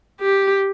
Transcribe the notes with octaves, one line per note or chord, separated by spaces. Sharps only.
G4